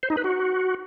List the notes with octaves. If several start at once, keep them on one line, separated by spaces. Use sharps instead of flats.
C5
D#4
B4
F#4